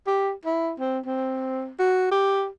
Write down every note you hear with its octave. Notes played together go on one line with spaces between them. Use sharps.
G4
E4
C4
C4
F#4
G4